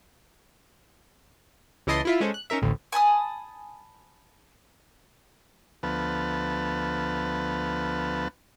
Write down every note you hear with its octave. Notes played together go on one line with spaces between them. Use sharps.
C#2 E3 E4 D#5 A5 C6
E4 F4 E5
G#3 C#4 A4 C5
F#6
C#4 D#4 A#4 E5
A1 D2 A2
G#5 A5 B5 D#6
D2 F3 B3 B4 A5